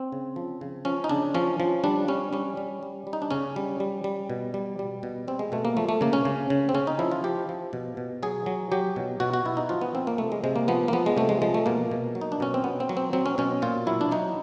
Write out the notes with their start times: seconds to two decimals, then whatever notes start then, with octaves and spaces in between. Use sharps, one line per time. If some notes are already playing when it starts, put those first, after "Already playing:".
Already playing: C4
0.12 C#3
0.36 F3
0.61 C#3
0.85 F3 C#4
1.04 D#4
1.09 C#3 D4
1.34 F3 C#4
1.60 F3
1.84 G3 D4
2.08 G3 C#4
2.33 G3 C#4
2.57 G3
2.83 G3
3.07 G3
3.13 D#4
3.22 D4
3.31 C#3 C#4
3.56 G3
3.80 G3
4.04 G3
4.29 B2
4.54 G3
4.79 G3
5.03 B2
5.28 G3 C4
5.39 G#3
5.52 B2 A3
5.65 A#3
5.77 F3 A3
5.89 A3
6.01 C#3 A#3
6.13 C#4
6.25 C#3
6.50 C#3
6.69 C4
6.74 C#3 C#4
6.87 D#4
6.99 F3 E4
7.11 F4
7.24 F3 G4
7.49 F3
7.73 B2
7.97 B2
8.23 F#3 G#4
8.46 F#3
8.72 F#3 G4
8.96 B2
9.20 B2 F#4
9.34 F#4
9.45 B2 E4
9.57 D#4
9.69 F3 F4
9.81 B3
9.95 F3 C4
10.07 A#3
10.18 C3 A3
10.32 G#3
10.44 C3 G#3
10.56 A#3
10.68 F3 B3
10.88 A#3
10.93 F3 B3
11.06 G#3
11.17 C3 A3
11.29 G#3
11.42 F3 G#3
11.54 A3
11.66 B2 A#3
11.91 B2
12.15 F#3
12.21 D#4
12.32 D4
12.40 B2 C#4
12.54 C4
12.64 B2 B3
12.80 C4
12.89 F#3
12.97 C4
13.13 F#3 C4
13.26 C#4
13.38 B2 C#4
13.62 A#2 F4
13.87 F#3 E4
14.01 D4
14.12 F#3 D#4